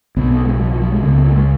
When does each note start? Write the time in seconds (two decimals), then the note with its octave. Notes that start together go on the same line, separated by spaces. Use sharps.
0.16 B1 B2 B3
0.31 B3
0.45 G#3
0.60 F#3
0.71 F3
0.81 F#3
0.92 G#3
1.03 C#2 C#3 B3
1.14 A#3
1.24 A#3
1.36 G#3